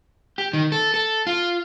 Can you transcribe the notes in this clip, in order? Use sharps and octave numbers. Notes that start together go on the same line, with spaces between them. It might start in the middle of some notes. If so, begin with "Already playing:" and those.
G4
D#3
A4
A4
F4